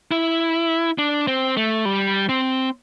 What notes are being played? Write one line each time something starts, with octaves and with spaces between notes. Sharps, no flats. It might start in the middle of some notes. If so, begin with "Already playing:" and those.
E4
D4
C4
A3
G3
C4